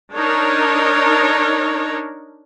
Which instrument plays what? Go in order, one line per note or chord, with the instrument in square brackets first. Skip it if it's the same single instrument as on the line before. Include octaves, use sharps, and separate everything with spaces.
[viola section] D4 D#4 A#4 C#5